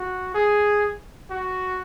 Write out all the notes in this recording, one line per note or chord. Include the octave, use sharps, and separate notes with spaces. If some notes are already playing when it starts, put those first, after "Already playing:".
Already playing: F#4
G#4
F#4